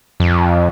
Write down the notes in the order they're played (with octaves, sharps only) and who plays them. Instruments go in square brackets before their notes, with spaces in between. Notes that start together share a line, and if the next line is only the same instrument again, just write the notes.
[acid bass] F2